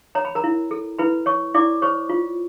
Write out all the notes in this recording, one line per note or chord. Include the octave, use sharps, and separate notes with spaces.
C#5 A#5
B5
A#4 A#5
E4
A4
E4 B4 B5
C#5 C#6
E4 D5 D6
C5 C#5 C#6
F4